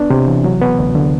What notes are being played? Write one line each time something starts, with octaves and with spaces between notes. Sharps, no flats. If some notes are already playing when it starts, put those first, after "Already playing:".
Already playing: B3 D4
C3
E3
F#3
B3
D2
D3